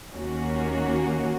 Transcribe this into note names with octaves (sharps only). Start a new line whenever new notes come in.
D#2 D#3 A#3 C#4 F#4